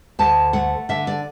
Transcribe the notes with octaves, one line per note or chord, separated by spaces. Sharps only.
D2 A5
A3 F#5
D3 E5
D5